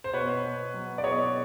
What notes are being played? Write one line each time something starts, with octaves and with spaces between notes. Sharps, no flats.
C5
B2 B4 C#5
B3
F#3
D5
B2 C#5 D#5